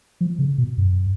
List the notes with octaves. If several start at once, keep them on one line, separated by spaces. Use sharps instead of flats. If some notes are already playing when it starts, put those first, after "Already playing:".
F3
C#3
B2
F#2